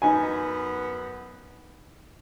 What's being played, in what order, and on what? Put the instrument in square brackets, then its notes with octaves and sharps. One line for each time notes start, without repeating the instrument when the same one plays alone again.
[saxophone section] F#2 B3 [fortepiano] D#4 G#5